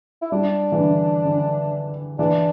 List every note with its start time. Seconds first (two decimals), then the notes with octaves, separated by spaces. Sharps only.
0.22 E4
0.32 G3 D4
0.72 E3
0.79 D3
1.25 D3
2.18 E3 D4